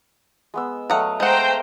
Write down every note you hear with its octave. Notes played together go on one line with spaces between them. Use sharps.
G#3 B3 E6
F#3 A3 D#5 F5 F#5
G#3 C5 F#5 G5 A#5